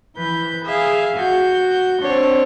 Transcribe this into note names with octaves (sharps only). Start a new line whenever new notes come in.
E3 B4 G6
G#4 E5 F5
F#4 G6
C4 D4 C#5